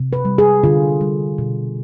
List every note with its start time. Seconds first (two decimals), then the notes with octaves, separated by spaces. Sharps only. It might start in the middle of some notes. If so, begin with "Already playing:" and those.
Already playing: C3
0.13 B4
0.25 G3
0.38 G#4
0.64 D3 F4
1.01 G3
1.38 B2